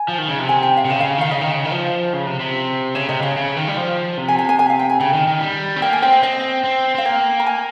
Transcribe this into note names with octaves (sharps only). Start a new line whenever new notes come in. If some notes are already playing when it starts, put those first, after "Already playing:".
Already playing: G#5
F3
D#3
C#3
C3
G#5
G5
F5
C3
C#3 D#5
C#3 F5
D#3 F5
C#3 D#5
D#3
C#3
D#3
F3
C#3
C3
C3
C#3 C#5
C3 D#5
C#3 F5
C#3
D#3
G3
F3
C3
G#5
G#5
G#5
G#5
F5
G5
G#5
C#3 G5
D#3
D#3
G3
C4
A#3 G5
G#5
C4 G5
D#5
C4 D#5
C4
C4 F5
A#3 G5
A#5
G#5